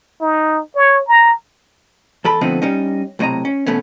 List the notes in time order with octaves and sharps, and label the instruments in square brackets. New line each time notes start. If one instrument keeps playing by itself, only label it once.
[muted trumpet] D#4
C#5
A#5
[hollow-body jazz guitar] E2 A4 B5
D3 F3 A3 B3 C4 D#4
G3 C#4 D#4
B1 A2 C3 D#5 A#5
C#4
E2 B2 A3 B3 C#4